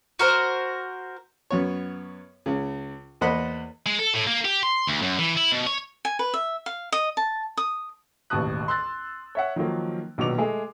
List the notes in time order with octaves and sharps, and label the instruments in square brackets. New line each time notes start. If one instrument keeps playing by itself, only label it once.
[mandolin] F#4 A#4 C5
[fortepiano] F#2 B3 C#5
C#2 C#3
E2 A#3 C5 D#5 F#5 B5
[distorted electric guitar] G#3
A4
A2
A#3
G4
C6
D2
F#2
E3
E4
B2
C#5
[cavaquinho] G#5
B4
E5
F5
D#5
A5
D#6
[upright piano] E1 A1 D#2 A5 D#6 F#6
C6 E6 F#6 A6
C#5 E5 F#5
D#3 F3 F#3 A#3
A#1 B2 D#3 F#3 D6 F7
G#3 A3 G#4